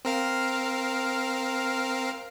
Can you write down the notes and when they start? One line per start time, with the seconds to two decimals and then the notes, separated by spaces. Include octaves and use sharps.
0.05 C4 A#4 F5